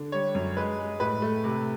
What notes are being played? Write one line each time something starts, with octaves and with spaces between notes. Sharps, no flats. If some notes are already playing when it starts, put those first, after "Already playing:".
Already playing: D3
G3 C#5
F#2
G#3 B4
G#3
A2 B4
A3
C3